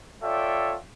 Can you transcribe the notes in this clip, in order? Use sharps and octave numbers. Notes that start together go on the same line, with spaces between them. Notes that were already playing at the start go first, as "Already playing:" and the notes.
F4 A4 C#5 D5 E5 G5